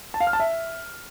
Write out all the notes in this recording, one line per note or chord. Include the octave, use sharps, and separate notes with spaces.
A5
F5
F6
A5
E5